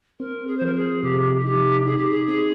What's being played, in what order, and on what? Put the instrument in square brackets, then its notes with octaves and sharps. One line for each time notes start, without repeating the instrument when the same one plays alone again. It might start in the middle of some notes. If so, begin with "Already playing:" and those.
[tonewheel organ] C4 [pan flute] A#4
[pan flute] G#4
C5
[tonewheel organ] F3 [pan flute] A#4
[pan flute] G#4
[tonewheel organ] C3 [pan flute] G4
[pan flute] G#4
[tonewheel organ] D#4 [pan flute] G4
[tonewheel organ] D#4 [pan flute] G#4
[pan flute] G4
G#4
[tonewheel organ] C4 [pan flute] G#4